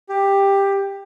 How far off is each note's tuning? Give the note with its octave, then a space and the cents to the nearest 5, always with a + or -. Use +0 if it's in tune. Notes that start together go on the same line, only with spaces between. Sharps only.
G4 +10